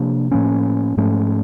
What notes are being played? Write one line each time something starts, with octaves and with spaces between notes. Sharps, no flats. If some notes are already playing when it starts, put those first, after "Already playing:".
Already playing: C3 F3 A#3 D4
A2 F3 A#3 C#4
G#2 F3 A3 C#4